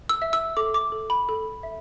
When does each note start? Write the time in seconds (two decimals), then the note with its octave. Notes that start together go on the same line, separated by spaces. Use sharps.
0.09 E6
0.22 E5
0.33 E6
0.57 A4 D6
0.74 D6
0.92 A4
1.10 B5
1.29 A4
1.63 E5